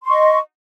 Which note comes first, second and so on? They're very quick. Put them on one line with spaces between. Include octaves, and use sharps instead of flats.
C6 C#6 D#5